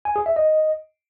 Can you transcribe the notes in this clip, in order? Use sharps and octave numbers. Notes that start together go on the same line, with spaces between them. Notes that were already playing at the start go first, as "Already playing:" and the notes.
G#5
G#4
E5
D#5